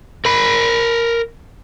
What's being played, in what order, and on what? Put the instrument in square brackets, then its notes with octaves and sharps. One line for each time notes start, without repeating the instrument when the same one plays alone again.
[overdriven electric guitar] A#4 B5